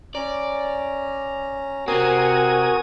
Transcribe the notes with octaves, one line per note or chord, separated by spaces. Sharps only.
C#4 D5 A#5
C3 C4 F#4 A#4 G#5 D#6